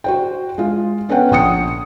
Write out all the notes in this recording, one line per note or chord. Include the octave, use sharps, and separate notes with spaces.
F#4 C5 G5
G#3 F4
B3 C#4 A4 B4 F#5 G5
A#1 G5 D#6 C#7